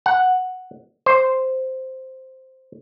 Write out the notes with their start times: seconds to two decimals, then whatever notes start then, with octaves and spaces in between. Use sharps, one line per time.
0.06 F#5
1.06 C5